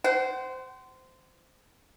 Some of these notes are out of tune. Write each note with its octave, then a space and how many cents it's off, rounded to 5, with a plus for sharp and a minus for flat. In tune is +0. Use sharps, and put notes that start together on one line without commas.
C5 -15 F#5 +40